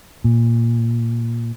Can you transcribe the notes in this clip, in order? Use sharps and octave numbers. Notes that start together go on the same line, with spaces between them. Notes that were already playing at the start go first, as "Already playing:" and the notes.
A#2